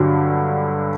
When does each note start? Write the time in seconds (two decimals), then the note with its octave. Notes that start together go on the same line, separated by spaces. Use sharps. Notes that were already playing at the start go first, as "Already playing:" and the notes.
Already playing: G2 D3 F#3